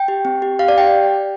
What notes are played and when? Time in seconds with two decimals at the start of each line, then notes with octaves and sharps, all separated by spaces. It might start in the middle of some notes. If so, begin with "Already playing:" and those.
Already playing: G5
0.08 G4
0.25 C4
0.42 G4
0.59 G4 F5
0.68 D5
0.78 G4 G5